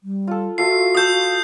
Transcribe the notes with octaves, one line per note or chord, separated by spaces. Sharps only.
G3
F4 A4
F4 F#4 A4 E5 C7
F4 A4 D#6 G6